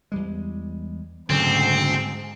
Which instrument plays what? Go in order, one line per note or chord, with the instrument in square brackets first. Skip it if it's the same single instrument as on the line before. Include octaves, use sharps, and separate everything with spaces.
[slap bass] E2 G3 G#3
[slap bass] D#1 C#3 F#3 [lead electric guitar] D2 [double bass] G#2 [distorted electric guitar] C4